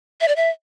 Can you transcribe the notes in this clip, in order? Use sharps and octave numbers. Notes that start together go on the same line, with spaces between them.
E5
D5
E5